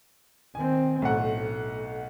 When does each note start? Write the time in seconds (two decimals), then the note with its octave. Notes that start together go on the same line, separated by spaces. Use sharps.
0.55 D#3 C4 G#5
1.02 B1 A2 A3 F#5